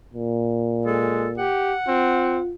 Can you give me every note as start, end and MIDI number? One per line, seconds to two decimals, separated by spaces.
0.14 1.49 46
0.86 1.27 56
0.86 1.30 69
1.38 1.75 67
1.38 2.47 78
1.88 2.40 60
1.88 2.55 65